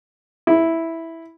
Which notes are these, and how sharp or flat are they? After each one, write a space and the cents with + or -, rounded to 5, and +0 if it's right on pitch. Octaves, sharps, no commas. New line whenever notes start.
E4 -5